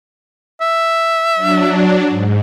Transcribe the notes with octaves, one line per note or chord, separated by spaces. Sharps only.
E5
F#3 D4
G#2